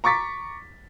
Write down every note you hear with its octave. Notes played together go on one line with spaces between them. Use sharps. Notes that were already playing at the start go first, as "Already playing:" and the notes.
A#5 C#6 D6 A6 B6